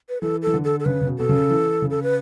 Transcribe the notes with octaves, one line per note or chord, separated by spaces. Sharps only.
B4
E3 A4
E3 A4
D3
A4
A4
C#3 B4
C#3
B2
B2 A4
C#3
E3
C#3
A4
B4